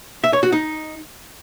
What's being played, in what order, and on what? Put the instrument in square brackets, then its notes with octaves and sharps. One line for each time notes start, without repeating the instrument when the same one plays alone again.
[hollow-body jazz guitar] E5
C#5
F#4
D#4